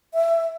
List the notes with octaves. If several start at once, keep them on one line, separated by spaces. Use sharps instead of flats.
E5